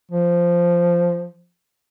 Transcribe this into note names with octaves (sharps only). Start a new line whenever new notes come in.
F3